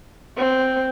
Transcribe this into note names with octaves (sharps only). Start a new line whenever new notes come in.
C4